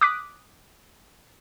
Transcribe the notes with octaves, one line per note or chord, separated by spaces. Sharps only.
D6 D#6 F#6 B6